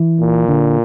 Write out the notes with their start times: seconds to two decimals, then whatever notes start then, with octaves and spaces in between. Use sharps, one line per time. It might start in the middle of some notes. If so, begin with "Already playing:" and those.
Already playing: E3
0.20 A#2
0.49 D3